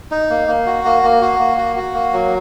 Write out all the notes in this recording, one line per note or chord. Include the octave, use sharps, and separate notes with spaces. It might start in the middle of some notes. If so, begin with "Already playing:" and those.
D#4
A#3
A#3
F#4
A#3
A#3
F#4
A#3
F#4
F#4
A#3
F#3